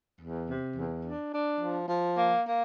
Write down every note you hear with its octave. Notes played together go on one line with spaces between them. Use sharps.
E2
C3
E2
D4
D4
F3
F3
A#3
A#3